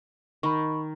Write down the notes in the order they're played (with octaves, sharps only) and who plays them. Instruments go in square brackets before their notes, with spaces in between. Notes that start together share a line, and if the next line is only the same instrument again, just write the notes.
[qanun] D#3 [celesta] B5 C#6